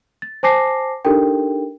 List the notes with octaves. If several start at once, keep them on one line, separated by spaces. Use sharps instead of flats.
A6
C5 G#5 A5 D6 A#6 C7
D4 D#4 G4 A4 A#4 G5